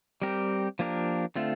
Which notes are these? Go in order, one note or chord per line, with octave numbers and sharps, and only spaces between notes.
G3 C4 G4 A#4
F3 A#3 D4 G4 A#4
D3 A3 C4 F4 A4